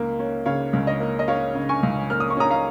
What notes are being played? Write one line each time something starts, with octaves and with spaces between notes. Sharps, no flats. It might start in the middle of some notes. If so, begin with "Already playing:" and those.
Already playing: C#2 A#3
C#4
C#3 C#5 F5
C#2
D#5
A#3
D#5
C#4 C#5 F5
C#3
G#5 C#6
C#2
A#3 F6
D#6
C#6
C#4 A#5 D#6
F5 A#5